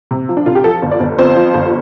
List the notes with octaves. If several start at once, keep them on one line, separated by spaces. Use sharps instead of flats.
C3
F3
D4
C2 F4
G4
F3 A4
G1
D5
G1
F2 C5
F3
G1